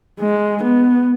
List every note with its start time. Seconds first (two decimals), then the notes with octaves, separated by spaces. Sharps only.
0.20 G#3
0.63 B3